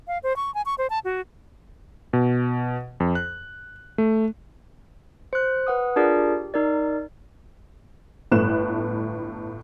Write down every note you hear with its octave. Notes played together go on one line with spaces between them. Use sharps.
F5
C5
C#6
G#5
C#6
C5
A5
F#4
B2
F2
F#6
A3
C5 F#6
B4 F#5 D#6
D4 F4 G#4 A#4 D5
G4
D#4 A#4 D5
G1 A2 A3 F#6 E7